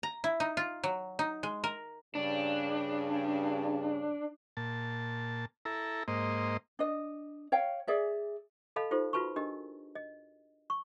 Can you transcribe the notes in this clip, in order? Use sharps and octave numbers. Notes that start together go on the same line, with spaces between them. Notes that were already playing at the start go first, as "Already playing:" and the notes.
A#5
E4
D#4
F4
F#3
D#4
G#3
A#4
G2 C#3 D4
A#2 A5
E4 A4 A#5
G#2 A#3 C5 D#5
D4 D#5
C#5 F5 G5
G#4 D5 E5
A4 D#5 F5 A5 B5
D#4 F4 G4 A4 C5
F4 F#4 B4 A5 B5 C#6
D4 G4 A#4 D#5
D#5
C#6